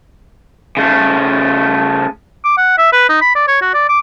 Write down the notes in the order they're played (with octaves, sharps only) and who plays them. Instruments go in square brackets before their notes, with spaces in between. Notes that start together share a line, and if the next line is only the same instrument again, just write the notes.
[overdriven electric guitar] C#3 A3
[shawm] D6
F#5
E5
B4
D#4
B5
D5
C#5
F#4
D5
D6